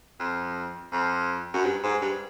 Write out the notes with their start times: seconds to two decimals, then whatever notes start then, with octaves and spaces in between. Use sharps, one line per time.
0.20 F2
0.93 F2
1.54 F#2
1.66 G2
1.84 G#2
2.02 G2